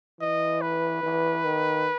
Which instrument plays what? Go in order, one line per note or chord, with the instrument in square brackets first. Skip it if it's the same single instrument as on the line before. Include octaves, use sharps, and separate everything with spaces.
[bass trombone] E3 [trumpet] D#5
[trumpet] B4
[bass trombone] E3
D#3